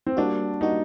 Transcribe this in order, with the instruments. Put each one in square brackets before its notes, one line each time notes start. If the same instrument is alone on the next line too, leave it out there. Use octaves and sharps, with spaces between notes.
[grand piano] C4
[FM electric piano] G3 A#3 F#4 [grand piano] D4
[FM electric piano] G3 A#3 F#4 [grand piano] D#4